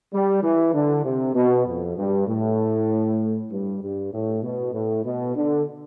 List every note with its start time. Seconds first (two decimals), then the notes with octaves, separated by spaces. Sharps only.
0.12 G3
0.42 E3
0.73 D3
1.04 C3
1.35 B2
1.66 F2
1.97 G2
2.27 A2
3.51 G2
3.81 G2
4.12 A2
4.43 B2
4.73 A2
5.04 B2
5.35 D3